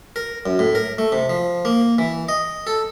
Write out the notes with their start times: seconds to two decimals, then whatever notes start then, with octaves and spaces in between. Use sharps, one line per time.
0.16 A#4
0.46 F#2
0.59 A2
0.75 A#4
0.98 A3
1.12 C3
1.30 F3
1.65 A#3
1.98 E3
2.29 D#5
2.67 A4